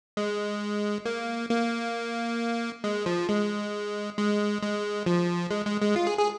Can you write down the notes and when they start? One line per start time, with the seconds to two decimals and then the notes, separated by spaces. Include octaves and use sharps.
0.17 G#3
1.06 A#3
1.50 A#3
2.84 G#3
3.06 F3
3.29 G#3
4.18 G#3
4.62 G#3
5.06 F3
5.51 G#3
5.66 G#3
5.81 G#3
5.96 F4
6.07 G#4
6.18 G#4